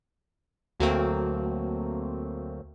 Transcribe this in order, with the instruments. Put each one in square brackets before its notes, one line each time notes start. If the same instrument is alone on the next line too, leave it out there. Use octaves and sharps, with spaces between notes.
[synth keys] D2 F#3 A3 A#3 C4